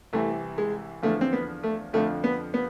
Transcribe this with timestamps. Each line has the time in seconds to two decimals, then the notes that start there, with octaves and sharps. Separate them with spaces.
0.13 C2 C3 E3 A3
0.58 G#3
1.02 E2 D3 F3 A3
1.21 C4
1.33 B3
1.63 A3
1.93 F2 D3 F3 A3
2.24 B3
2.54 B3